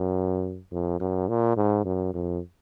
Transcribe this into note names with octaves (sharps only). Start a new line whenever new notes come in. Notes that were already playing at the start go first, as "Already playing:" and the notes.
Already playing: F#2
F2
F#2
A#2
G#2
F#2
F2